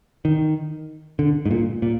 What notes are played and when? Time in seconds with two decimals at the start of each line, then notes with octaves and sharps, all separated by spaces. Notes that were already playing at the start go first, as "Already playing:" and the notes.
0.25 D#3
1.19 D3
1.46 G#2
1.51 A#2
1.82 A#2